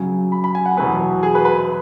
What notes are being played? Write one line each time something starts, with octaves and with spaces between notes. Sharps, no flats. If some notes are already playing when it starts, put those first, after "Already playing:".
Already playing: F#2 C#3 F#3 G#5
B5
B5
G#5
F#5
E2 B2 F#3 B3 B4
G#4
B4
B4
B4